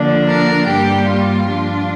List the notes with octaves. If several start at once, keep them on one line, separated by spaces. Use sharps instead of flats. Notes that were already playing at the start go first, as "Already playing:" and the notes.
Already playing: D3 F3 A#3 D4
A#4
G2 G3 A#3 G4
F4
G2 F3 D4